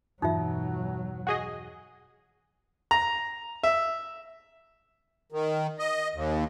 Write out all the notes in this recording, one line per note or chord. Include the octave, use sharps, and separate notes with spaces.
E1 G2 B2 E3 F#3 D#4 F4 E5
F#4 G#4 D#5
A#5
E5
D#3
D#5
D#2